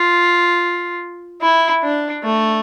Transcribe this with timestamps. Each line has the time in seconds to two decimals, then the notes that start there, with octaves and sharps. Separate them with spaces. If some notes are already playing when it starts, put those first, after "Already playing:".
Already playing: F4
1.42 E4
1.83 D4
2.23 A3